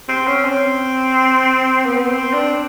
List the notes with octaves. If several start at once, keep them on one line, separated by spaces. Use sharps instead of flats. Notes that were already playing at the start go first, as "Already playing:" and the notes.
C4
C#4
C4
B3
C4
D4